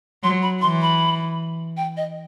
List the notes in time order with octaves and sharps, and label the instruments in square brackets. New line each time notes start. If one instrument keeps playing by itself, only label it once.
[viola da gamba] F#3 [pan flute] C6
[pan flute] B5
[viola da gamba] E3 [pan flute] C6
[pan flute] B5
G5
D#5